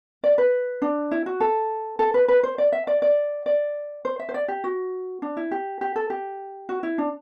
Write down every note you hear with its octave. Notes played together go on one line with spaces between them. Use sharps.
D5
B4
D4
E4
F#4
A4
A4
B4
B4
C5
D5
E5
D5
D5
D5
C5
E5
C5
D5
G4
F#4
D4
E4
G4
G4
A4
G4
F#4
E4
D4